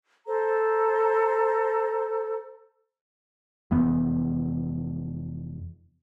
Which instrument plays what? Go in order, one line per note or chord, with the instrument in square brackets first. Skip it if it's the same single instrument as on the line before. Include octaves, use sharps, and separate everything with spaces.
[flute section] A4 C5 A#5
[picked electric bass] F1 E3 B3